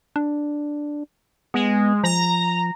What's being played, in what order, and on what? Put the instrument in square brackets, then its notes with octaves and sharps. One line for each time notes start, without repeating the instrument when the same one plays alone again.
[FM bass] D4
[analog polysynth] G#3 [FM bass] B3
[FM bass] F3 [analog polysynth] A#5